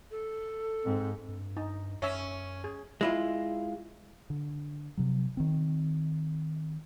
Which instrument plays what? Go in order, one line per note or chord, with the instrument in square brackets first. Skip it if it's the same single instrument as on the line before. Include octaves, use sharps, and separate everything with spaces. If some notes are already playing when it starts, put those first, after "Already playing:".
[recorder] A4
[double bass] G#2 [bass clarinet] C4
[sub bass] G2
[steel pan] D#4
[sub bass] F#2 [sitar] C#4 [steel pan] C#5 E5 E6
[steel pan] G#4
[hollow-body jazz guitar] G#3 E4 F4
[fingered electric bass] D3
C3 F3 F#3
D#3 C4